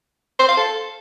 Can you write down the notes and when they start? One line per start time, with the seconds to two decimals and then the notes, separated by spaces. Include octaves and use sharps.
0.39 C5
0.48 F5
0.57 A4